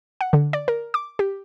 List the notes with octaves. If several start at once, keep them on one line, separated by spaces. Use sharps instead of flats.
F#5
D3
D5
A#4
D6
G4